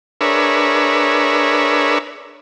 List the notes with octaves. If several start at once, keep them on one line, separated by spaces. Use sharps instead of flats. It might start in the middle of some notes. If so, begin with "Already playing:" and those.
D4 G#4 A#4 B4 C#5 E5